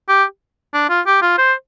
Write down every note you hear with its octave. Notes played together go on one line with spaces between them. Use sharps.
G4
D4
F4
G4
F4
C5